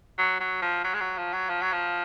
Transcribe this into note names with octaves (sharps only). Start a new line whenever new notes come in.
F#3
F#3
F3
F#3
G#3
F#3
F3
F#3
F3
F#3
F3